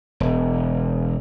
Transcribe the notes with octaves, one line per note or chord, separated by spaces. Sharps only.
E1